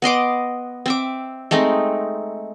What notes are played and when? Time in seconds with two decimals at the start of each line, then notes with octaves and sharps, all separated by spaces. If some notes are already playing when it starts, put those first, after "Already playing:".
0.02 B3 D#5 C6 D6
0.86 C4 E5 D6
1.51 G#3 A3 C4 D#4